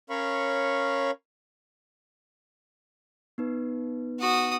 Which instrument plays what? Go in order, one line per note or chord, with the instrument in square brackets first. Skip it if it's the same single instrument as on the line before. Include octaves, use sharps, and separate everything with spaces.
[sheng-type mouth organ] C#4 A#4 C#5 F5 B5 C#6
[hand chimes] B3 D#4 B4
[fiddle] F#4 D#6